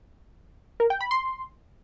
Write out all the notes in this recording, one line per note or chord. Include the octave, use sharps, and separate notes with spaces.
A#4
G5
B5
C6